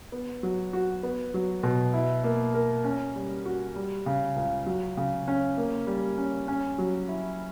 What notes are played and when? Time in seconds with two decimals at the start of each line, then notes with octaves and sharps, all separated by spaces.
0.12 B3
0.43 F#3
0.73 F#4
1.03 B3
1.34 F#3
1.63 B2
1.94 E4
2.24 A#3
2.55 A#4
2.84 C#4
3.16 G3
3.45 F#4
3.76 G3
4.06 C#3
4.36 C#2
4.66 F#3
4.97 C#3
5.28 C#4
5.58 A#3
5.87 G3
6.18 C#4
6.48 C#4
6.78 F#3
7.08 E4